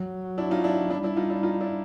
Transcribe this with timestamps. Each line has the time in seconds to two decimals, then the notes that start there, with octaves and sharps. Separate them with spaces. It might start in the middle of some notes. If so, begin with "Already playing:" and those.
Already playing: F#3
0.38 D4 E4
0.51 D#4 F4
0.64 D4 E4
0.90 G3 D4 E4
1.03 D4 E4
1.17 D#4 F4
1.30 D4 E4
1.43 D#4 F4
1.61 D4 E4